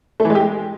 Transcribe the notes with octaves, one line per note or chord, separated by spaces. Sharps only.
A3
E3
G#3
G4
G#3